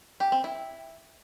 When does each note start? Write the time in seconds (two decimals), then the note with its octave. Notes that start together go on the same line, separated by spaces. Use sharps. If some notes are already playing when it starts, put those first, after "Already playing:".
0.20 G4
0.32 C4
0.44 E4